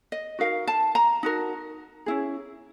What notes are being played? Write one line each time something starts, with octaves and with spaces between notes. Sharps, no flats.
D#5
D#4 F#4 A#4 F5
A5
A#5
D#4 F#4 A#4
C#4 E4 G#4